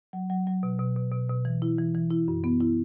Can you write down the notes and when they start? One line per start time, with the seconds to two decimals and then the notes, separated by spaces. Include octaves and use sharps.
0.13 F#3
0.30 F#3
0.47 F#3
0.63 B2
0.79 B2
0.96 B2
1.12 B2
1.29 B2
1.45 E3
1.62 E4
1.79 E3
1.95 E3
2.11 E4
2.28 F#2
2.44 B3
2.61 E4